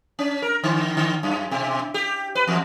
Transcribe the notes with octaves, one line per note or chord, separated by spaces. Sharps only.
C#4
A#4
D3
D3
F#2
B2
G4
B4
E2